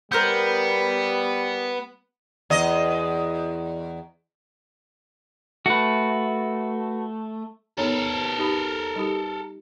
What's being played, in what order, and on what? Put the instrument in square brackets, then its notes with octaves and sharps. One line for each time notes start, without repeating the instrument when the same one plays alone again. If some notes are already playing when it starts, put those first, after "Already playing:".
[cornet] G3 [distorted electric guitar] B3 [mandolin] A#4 C5 G6
[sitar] E2 D#5
[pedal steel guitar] A3 [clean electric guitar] F#4 B4
[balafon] B3 D#4 C#5 [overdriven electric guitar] A4 A#4
[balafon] D#4 G4 B5
G3 D#4 G4